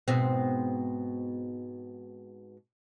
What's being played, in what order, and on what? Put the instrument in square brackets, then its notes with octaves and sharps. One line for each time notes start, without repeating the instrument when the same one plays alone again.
[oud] G#2 B2 C4